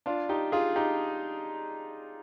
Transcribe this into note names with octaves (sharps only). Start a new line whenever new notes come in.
D4 F4
D#4 G4
F4 G#4
D#4 G4